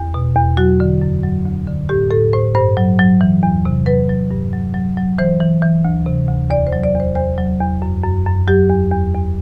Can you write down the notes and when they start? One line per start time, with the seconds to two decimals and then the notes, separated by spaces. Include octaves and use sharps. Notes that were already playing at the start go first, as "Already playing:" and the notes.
Already playing: E2
0.14 B2
0.36 E2
0.57 F#3 F#4
0.80 D3
1.02 F#2
1.23 F#3
1.45 D2
1.67 D3
1.89 A2 G4
2.11 A2 A4
2.33 A2 C5
2.55 G2 C5
2.77 F#3
2.99 F#3
3.21 E3
3.43 E2
3.65 C3
3.86 F#3 B4
4.09 F#3
4.31 G2
4.53 F#3
4.74 F#3
4.97 F#3
5.18 E3 C5
5.40 E3
5.62 E3
5.85 D2
6.06 C3
6.28 D2
6.50 E2 D5
6.67 C5
6.73 F#3
6.84 D5
6.94 E2
7.00 C5
7.15 E2 C5
7.38 F#3
7.60 E2
7.82 F#2
8.04 F#2
8.26 F#2
8.48 F#3 G4
8.70 E2
8.92 E2
9.14 E2